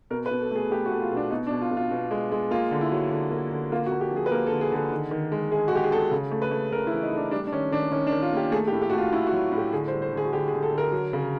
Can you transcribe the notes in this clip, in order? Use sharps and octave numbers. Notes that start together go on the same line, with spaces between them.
B2 A#4
B4
B2
A4
A3 G#4
A3 G4
F#4
A3
F4
B2 D4
B2 D#4
D4
B2
F4
B2
F4
B2
G#3
G#3
A#3 F4
D3
E4
F#3
D3
A#3
D3
A#3 F4
F#4
A#3
G4
F3
G#4
B4
A#3 A#4
A4
D3
G#4
D3 G#4
D#3
D#3
G#3
G#3 G#4
F#4
G#3 G4
G#4
G#3 A4
C#3
A3
B4
A3
C#3 A#4
E4
E3
D#4
A3
D4
G3 D4
D4
D#3 C#4
D#3 D4
D#3 C#4
D4
D#3
F4
A#3 G4
A3 G#4
G4
A2
G4
F#4
A3
F4
A2 E4
F#4
F#3
A2
G4
D3 G#4
C5
G3
C5
D3
G#4
F#4
D3 G4
G#4
D3
A4
D3
A#4
F#3
C#3